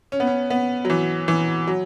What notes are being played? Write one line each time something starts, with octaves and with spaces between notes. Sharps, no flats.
C#4
B3
C#4
B3
F#3
E3
E3
F#3